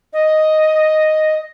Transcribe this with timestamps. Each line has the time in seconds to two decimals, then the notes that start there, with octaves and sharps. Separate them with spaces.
0.13 D#5